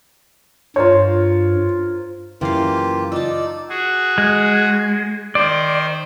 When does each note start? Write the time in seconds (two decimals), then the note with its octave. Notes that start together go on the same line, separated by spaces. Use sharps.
0.76 G2 F4 A#4 C5 C#5
2.41 F#2 C#3 E3 A#3 F4 G4 F5
3.12 D#4 F4 D5 A5 E6
3.69 F#4 G#4
4.18 G#3
5.35 D#3 C5 D5